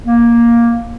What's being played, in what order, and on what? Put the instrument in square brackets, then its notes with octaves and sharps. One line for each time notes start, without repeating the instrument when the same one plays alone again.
[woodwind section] A#3